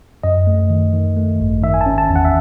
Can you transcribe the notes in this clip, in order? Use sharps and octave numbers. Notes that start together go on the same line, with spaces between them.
F#2 D#5
A3
D#3
D#3
A3
G#1
D#3 E5
G#5
A5
C#4
A5
E2
F#5
E5